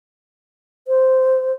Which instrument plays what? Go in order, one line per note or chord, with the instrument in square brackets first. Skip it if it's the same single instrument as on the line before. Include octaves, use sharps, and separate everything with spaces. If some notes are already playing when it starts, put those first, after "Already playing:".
[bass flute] C5